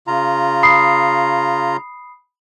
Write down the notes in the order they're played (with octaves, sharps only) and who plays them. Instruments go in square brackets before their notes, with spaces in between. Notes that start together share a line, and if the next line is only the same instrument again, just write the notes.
[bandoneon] C#3 F4 A#5
[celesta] B5 D#6 C7